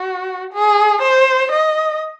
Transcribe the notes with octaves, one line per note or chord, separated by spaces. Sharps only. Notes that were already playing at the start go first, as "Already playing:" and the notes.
Already playing: F#4
G#4
C5
D#5